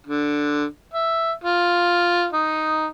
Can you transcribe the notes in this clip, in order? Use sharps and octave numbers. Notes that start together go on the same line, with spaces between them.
D3
E5
F4
D#4